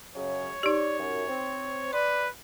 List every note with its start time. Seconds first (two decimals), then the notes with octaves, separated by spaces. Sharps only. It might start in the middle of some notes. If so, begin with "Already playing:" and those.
0.15 F#2 C#3 F#3 C#5
0.63 D#4 G4 D5
0.98 F#2
1.28 C4
1.93 B4 D5 C6